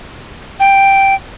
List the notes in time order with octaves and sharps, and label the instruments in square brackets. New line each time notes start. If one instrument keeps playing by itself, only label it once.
[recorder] G5